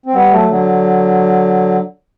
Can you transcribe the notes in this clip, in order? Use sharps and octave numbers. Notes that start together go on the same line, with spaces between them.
C4
G3 B3
F#3 A3
D3 F#3